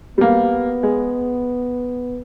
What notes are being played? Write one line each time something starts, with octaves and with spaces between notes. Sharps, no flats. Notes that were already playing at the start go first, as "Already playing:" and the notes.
G3 A#3 B3
G#3